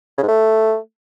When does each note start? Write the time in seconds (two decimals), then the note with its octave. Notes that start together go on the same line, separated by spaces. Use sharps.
0.17 C#3
0.23 G#2
0.28 A3